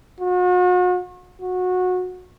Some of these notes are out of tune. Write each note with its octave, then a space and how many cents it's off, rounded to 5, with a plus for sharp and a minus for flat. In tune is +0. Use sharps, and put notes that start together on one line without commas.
F#4 -40
F#4 -20